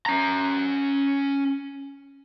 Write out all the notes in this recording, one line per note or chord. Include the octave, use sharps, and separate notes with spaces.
C#4 A#5